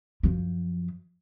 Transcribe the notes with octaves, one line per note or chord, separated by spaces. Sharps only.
F#2 F3